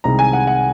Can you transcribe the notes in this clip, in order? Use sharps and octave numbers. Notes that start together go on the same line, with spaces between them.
C2 C3 D#3 G#3 A#5
G#5
F#5
F#5